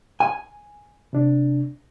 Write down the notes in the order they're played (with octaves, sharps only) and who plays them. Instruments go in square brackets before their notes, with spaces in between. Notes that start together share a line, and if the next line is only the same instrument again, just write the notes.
[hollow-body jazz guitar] G#5
[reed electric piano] C3 D4